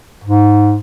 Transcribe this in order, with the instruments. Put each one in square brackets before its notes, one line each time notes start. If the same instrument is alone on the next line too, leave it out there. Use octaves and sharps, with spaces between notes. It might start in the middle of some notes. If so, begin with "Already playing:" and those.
[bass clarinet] G#2